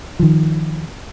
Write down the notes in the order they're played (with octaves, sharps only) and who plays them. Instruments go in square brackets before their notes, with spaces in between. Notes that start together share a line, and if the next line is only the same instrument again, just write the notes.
[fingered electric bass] D#3 F3